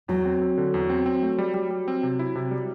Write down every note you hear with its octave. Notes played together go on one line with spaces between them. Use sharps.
E2 F#3
C4
C4
D3
E2
C4
C4
A3
G3
G3
G3
C4
C3
E4
C3
G3